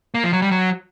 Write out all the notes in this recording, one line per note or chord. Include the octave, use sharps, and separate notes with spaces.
A#3
F3
F#3
G3
F#3